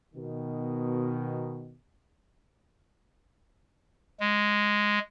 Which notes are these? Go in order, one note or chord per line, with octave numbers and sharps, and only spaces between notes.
B2 D#3
G#3